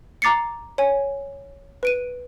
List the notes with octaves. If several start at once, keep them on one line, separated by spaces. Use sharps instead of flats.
A#5 D6 A6 C7 C#7
C#5 G#5
B4 D7 D#7